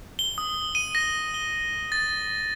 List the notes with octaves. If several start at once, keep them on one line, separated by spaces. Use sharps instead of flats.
G7
D#6
D#7
A#6
G7
A6